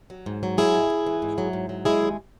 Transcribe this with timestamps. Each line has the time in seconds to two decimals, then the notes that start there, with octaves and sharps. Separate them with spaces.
0.10 F#3
0.26 G#2
0.43 F#3
0.58 G#3 E4 G#4
0.75 G#2
0.90 G#2
1.06 E3
1.22 G#2
1.38 F#3
1.53 G#2
1.69 F#3
1.85 G#3 E4 G#4
2.02 D#2